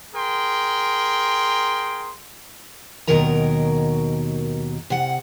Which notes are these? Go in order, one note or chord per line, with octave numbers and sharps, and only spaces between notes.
G#4 A#4 G5 C6
D#2 B2 D#3 F#3 A#4 A#5
C3 F#5